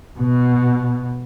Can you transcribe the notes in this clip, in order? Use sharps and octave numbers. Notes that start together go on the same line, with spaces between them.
B2